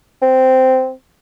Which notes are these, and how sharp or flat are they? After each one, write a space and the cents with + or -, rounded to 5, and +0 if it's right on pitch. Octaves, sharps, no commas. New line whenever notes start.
C4 -10